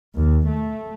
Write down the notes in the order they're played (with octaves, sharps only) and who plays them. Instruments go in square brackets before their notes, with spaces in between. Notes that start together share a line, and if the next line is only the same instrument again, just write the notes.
[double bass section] D#2
A3